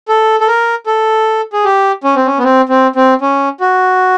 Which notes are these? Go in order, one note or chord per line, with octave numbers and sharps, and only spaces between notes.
A4
A4
A#4
A4
G#4
G4
C#4
C4
C#4
B3
C4
C4
C4
C#4
F#4